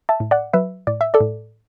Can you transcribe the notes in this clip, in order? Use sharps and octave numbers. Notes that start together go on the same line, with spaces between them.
E5 A5
A2
D5 F#5
F#3 B4 E5
A2 D5
E5
A4 D5
A2